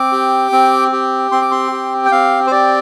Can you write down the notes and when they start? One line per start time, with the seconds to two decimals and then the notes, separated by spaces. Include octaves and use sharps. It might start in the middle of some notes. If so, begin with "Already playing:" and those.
Already playing: C4 D6
0.12 G4
0.52 C4
0.92 G4
1.32 C4 C6
1.42 D6
1.51 C6
1.72 G4
2.06 G5
2.12 C4 F5
2.47 C5
2.51 G4 D5